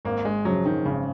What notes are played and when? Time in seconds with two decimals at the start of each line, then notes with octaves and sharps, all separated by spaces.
0.05 G#1 A#3
0.25 G#3
0.45 F#2 C#3 F3 F#3
0.65 D#3
0.85 G#1 C#3